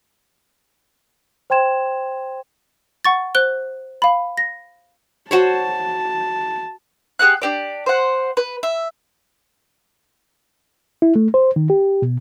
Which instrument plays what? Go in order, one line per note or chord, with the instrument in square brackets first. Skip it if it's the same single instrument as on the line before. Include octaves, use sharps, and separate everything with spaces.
[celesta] C5 G5 C6 G#6 E7
[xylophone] F#5 C#6 A6
C5 F#6 G7
F5 B5
A#6
[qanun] F#4 C5 C#5 [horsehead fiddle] A5
[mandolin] G4 G#4 F#5 F#6
D4 G4 D5
C5 F#5
B4
E5
[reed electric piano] E4
A3
C5
D#3
G4
B2